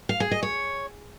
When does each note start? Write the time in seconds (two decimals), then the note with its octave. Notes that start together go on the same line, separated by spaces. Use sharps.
0.09 F5
0.20 G#4
0.31 D#5
0.43 C#5